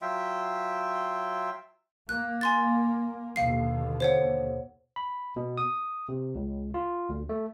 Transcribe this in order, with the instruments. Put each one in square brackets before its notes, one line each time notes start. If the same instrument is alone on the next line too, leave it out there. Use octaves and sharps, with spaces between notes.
[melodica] F#3 F4 E5 G5
[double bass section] A#3 [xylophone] F#6
[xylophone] G#5 C6 A6
[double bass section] D#2 B2 D3 [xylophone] F5 C7
[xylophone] C5 C#5 F#5
[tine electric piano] B5
B2
D#6
C3
C#2
F4
D2
A3